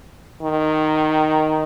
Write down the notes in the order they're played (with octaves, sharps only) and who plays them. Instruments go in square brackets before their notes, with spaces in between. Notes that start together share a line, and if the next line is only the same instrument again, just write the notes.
[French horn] D#3